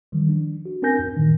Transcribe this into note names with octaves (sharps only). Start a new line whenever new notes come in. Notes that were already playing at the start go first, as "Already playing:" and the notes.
D#3 F3 G3
D4
F#4
C4 D4 A#4 G#5 G6 A#6
F#2
A#2 D#3